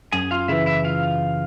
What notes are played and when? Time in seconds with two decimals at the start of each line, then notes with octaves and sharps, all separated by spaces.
0.12 F#2 G#4 G#5
0.31 F4 F5
0.48 C#3 E3 E4 E5
0.66 E4 E5
0.84 F4 F5